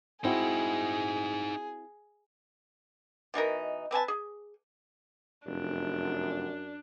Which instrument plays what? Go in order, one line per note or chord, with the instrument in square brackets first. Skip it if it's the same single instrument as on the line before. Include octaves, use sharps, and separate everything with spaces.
[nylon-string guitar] C4 E4 F#4 [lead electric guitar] D#4 C5 [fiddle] G#4
[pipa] B2 E3 D#4 A#4
C4 B4 G#5 A5
G#4
[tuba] F1 [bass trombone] F#2 [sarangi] D4